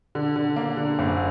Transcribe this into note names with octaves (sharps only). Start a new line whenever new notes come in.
D3
D3
A#3
D3
F#1